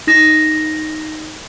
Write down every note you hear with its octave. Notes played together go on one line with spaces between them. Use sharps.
D#4 A#6 E7